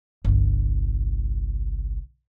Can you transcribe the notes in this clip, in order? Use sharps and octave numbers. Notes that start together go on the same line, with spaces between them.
G1 C2